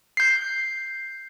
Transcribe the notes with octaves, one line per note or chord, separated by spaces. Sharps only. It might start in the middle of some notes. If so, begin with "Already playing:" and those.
G6 C7